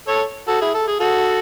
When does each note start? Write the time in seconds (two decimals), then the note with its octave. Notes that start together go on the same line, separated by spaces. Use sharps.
0.08 A4 C#5
0.48 F#4 A4
0.61 E4 G#4
0.74 A4
0.87 G#4
1.00 F#4 A4